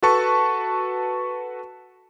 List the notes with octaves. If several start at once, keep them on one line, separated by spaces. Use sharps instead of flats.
F#4 A4 B4 A5 C#6